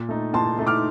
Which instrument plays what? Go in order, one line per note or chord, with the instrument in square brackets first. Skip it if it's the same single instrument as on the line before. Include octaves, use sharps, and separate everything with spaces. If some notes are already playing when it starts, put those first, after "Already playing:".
Already playing: [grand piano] A#2
A3 D#4
[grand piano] A#2 [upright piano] A5 C6
[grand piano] A3 D#4
[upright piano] D6 F6